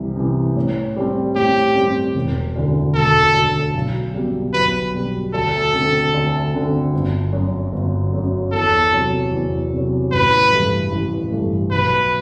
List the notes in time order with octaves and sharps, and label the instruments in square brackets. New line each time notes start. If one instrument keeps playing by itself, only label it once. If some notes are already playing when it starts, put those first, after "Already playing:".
Already playing: [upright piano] C2 C3 E3
C3 E3
A2
G3 C4
[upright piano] A2 [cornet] G4
[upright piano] G3 C4
E1
D2 D3
[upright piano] E1 [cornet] A4
[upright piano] D2 D3
B1
B2 G3
[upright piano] B1 [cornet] B4
[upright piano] B2 G3
[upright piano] D2 [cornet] A4
[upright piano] D3 A3 C4
D2
D3 A3 C4
G1
F#2 F#3
G1
F#2 F#3
[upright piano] E2 [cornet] A4
[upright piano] C3 F#3
E2
C3 F#3
[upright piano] A1 [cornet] B4
[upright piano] G2 E3 A3
A1
G2 E3 A3
[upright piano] B1 [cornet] B4